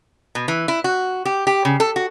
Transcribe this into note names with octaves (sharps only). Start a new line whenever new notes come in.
B2
E3
E4
F#4
G4
G4
C#3
A4
F#4